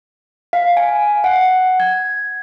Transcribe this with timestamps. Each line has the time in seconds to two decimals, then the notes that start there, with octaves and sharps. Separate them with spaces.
0.53 F5
0.77 G#5
1.24 F#5
1.80 G#6